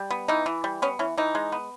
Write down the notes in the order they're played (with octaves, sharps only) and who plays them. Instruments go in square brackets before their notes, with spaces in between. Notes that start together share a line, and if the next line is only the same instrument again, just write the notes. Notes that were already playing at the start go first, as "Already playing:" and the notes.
Already playing: [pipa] G3
B3
E3 D#4
E3
G3
B3 C#4
E3 C#4
E3 D#4
G#3
B3